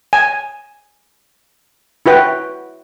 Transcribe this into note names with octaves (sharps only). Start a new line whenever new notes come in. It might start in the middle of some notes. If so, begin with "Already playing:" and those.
G#5
E4 F#4 B4 G5